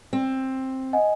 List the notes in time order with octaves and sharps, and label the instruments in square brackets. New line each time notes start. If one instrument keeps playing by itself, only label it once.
[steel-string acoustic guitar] C4
[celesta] D#5 F#5 G#5